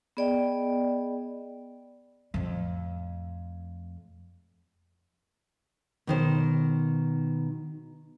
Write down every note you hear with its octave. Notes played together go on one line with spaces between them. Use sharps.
B3 G#4 D5 D#5 G5
F2 A2
B2 D#3 C5